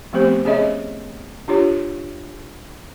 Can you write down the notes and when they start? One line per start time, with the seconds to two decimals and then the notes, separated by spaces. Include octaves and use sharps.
0.13 F3 A3 B3 C4 G4 C5
0.45 C#4 G#4 C#5 D#5 E5
1.48 D4 F4 G4 C#5